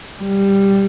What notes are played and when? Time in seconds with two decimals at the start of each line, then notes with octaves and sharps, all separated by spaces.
0.22 G3